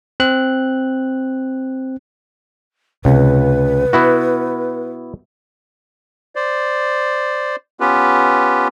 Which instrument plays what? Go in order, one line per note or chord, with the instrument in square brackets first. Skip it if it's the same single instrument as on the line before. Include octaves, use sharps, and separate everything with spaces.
[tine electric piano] C4 F#6
[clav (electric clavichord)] C#2 [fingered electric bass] C3 [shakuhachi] B4
[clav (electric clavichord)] B3 E4 F#4
[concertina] C5 D5
B3 C#4 F4 G4 B4